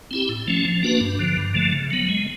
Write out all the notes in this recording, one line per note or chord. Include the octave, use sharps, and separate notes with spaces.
C4 E4 G4
A2
F3 A3 C#4
F3
A#3 D4 F#4 B4
G2
D3 F3
G2
D3 F3 A3
C#3
F#3 B3
G#3